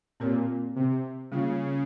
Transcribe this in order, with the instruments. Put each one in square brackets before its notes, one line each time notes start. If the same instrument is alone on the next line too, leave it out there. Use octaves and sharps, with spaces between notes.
[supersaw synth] A#2 [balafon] C4 G4 A#4 C#5
[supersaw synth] C3
[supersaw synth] C#3 [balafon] G3 A#3 F4